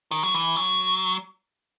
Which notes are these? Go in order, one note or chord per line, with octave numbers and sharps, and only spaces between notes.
D#3
F#3
E3
F#3